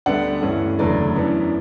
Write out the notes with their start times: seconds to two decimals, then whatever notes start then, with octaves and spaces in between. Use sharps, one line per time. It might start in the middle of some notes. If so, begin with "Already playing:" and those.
0.06 D2 D3 G3 B3 D5 F#5
0.42 G2 E3 A3 C#4
0.79 F#1 E2 D3 F#3 A3 B4 D5
1.16 F#2 E3 B3 D4